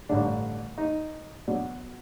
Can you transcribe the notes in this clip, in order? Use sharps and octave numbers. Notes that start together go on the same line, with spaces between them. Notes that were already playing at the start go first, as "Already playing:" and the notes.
A1 G2 D3 D4
D#4
B2 F#3 D4